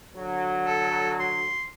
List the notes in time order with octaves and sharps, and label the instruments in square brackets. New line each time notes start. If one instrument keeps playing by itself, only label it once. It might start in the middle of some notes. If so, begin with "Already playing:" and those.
[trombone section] D3 F#3
[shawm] A4
C6